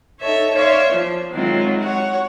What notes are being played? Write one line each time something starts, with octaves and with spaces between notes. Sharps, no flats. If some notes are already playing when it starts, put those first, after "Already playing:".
D#4 A4 C#5 E5
C#5 D5 E5 F5 C6
F3
D#3 F#3 G#3 C4 E4 F4
F#4 C#5 F#5